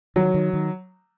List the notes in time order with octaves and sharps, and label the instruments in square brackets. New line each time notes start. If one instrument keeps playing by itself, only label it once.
[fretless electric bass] D#3 [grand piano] F#3
[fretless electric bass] D#3
D#3